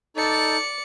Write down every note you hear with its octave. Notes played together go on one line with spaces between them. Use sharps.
D#4 A4 D5 C#7